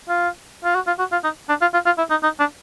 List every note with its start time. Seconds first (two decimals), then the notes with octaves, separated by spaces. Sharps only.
0.09 F4
0.64 F4
0.75 F#4
0.87 F4
0.99 F#4
1.12 F4
1.24 D#4
1.49 D4
1.61 F4
1.74 F4
1.86 F4
1.98 E4
2.10 D#4
2.23 D#4
2.39 D4